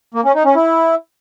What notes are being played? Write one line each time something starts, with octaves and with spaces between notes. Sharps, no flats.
A#3
C#4
D#4
C#4
E4